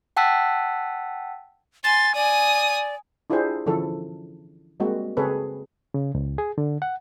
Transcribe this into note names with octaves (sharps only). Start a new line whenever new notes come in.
F#5 G5 A5 E6 F#6 B6
G#5 C6 A6
D5 G#5 D#6
D4 E4 F4 G4 G#4 C5
D3 E3 F3 C#4 E4 A4
G3 G#3 A#3 C4 F#4
C#3 C4 G#4 A4 B4 C#5
C#3
C#2
G#4
D3
F#5